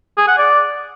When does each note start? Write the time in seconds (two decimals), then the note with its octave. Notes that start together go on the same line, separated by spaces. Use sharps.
0.17 G#4
0.28 F#5
0.38 D5